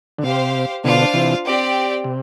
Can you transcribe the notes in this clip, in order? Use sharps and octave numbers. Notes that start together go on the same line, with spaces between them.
D3
C3 G4 C5 F5
B2 D3 D4 F4 C5 F5
C3 E3
C4 G4 D5 G5
C3